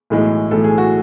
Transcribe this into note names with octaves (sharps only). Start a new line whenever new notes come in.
B1 A2 E3 G#3
B1 A2 E3 G#3 A4
G#4
F#4